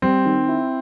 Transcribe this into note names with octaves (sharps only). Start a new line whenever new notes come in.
G3 C4
D#3
E4